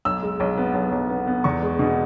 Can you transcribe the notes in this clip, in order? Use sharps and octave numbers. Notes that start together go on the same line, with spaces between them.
B1 E6
G#3
B1
B3
B1
B1
B3
B3
E2 C#6
G#3
B2